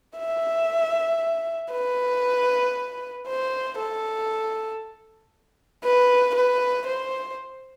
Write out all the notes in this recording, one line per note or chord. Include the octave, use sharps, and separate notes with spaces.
E5
B4
C5
A4
B4
B4
C5